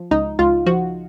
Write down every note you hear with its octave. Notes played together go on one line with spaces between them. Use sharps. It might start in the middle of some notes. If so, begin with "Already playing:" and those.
Already playing: F3
C#2 D#4
C#2 F4
F3 F#4